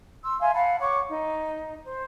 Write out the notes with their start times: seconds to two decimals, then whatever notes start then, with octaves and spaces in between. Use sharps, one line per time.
0.23 C6 E6
0.41 E5 F5 G#5 C6
0.53 F5 F#5 A5 B5
0.79 C#5 F#5 C#6 D6
1.08 D#4
1.84 C5